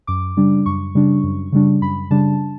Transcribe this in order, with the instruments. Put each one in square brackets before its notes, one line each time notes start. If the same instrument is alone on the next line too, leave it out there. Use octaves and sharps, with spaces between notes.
[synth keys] F#2 D6
C#3 G3 D4
F#2 C#6
C#3 G3 D4
F#2
C#3 G3 D4
F#2 B5
C#3 G3 D4 A5